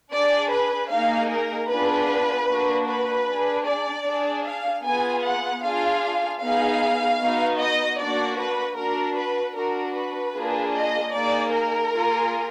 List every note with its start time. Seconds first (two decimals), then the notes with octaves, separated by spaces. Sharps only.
0.13 D4 G#4 D5
0.52 B4
0.91 A#3 D#4 G#4 F5
1.31 A#4
1.70 B3 D4 F4 G#4 B4
2.49 A#3 D4 F#4
2.89 B4
3.27 D4 G#4
3.67 D5
4.06 D4 G#4
4.46 F5
4.85 B3 F4 G#4 G#5
5.25 F#5
5.63 D4 F4 G#4 F5
6.42 B3 D#4 G#4 F5
7.20 B3 D#4 F#4
7.60 D#5
7.99 A#3 D4 F#4 D5
8.39 B4
8.77 D4 F#4 A#4
9.17 B4
9.56 D4 F#4 A#4
9.95 B4
10.35 A#3 D4 F4 G#4
10.75 D#5
11.13 A#3 D#4 G#4 D5
11.53 A#4
11.92 A#3 F4 G#4